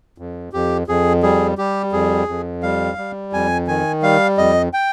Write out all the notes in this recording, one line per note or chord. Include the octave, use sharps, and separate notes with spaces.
F2
F2 G4
F2 G#4
G3 G#4
G3 G4
F2 G#4
F2
G3 F5
G3
F2 G#5
D#3 G#5
G3 F5
F2 D#5
G5